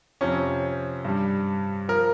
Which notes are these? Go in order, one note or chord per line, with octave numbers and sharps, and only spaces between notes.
F2 C3 F3 C#4
G2 G3
F3 A#4